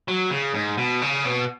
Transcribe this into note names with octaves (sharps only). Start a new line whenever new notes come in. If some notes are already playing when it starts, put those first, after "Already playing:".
F#3
C#3
G#2
B2
C#3
B2